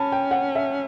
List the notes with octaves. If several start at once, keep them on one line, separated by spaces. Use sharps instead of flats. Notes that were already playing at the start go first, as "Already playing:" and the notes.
Already playing: C#4 A5 B5
G5
F#5
E5